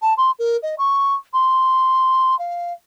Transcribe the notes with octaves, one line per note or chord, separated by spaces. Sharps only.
A5
C6
A#4
D#5
C#6
C6
F5